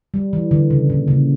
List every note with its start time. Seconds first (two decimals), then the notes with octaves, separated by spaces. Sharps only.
0.14 G3
0.33 E3
0.51 D3
0.70 C#3
0.90 A#2
1.08 C#3